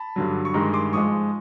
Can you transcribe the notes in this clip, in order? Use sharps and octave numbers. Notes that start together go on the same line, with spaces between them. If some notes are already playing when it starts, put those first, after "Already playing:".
Already playing: A5 B5
G2 D3 F#3
C#6
G2 D#3 G#3 A#5 C6
C6 D6
G#2 F3 G#3 C#6 D#6